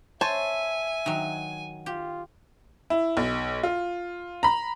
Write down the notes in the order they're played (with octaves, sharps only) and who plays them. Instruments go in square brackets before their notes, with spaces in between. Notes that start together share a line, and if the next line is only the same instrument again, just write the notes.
[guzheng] C5 [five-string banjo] C#5 A5 [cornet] E5 [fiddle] G#5
[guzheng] D#3 F#3
[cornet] F4 [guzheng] G4
[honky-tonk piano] E4
B1
F4
A#5 B5